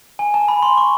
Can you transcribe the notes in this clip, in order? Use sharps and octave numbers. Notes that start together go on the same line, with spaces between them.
G#5
A5
B5
C6
C#6